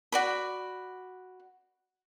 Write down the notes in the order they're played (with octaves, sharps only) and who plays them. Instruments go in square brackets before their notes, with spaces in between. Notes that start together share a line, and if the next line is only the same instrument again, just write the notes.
[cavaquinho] F#4 D5 B5